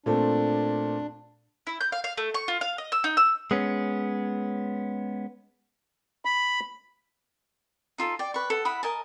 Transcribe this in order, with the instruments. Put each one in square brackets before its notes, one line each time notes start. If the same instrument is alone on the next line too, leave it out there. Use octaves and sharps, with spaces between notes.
[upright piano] A#2 A3 C4 [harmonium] D4
[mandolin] E4
G6
F5
F5
A3
C#6
F4
F5
D#5
E6
D#4
E6
[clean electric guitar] G#3 B3 C#4
[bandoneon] B5
[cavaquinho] D#4 F4 A4
D5 G5
B4 C#6
A4 F#5
E4 F#5 B5 D#6
A#4 D#5 G#5 A5